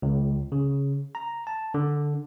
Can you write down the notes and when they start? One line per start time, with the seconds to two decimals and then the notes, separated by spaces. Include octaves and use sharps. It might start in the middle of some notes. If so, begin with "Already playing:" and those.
0.02 C#2
0.52 C#3
1.15 A#5
1.47 A5
1.74 D3